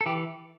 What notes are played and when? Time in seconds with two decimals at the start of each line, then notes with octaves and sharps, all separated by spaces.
0.01 A4
0.06 E3 G4